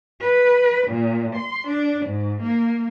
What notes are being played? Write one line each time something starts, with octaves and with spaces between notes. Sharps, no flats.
B4
A#2
C6
D4
G#2
A#3